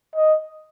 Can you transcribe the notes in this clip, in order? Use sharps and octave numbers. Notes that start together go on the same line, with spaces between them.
D#5